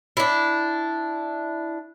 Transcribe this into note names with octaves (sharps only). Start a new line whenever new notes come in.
D4 E4